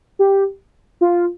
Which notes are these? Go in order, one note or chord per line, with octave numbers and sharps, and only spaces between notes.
G4
F4